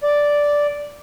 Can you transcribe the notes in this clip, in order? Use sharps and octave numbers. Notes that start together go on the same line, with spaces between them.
D5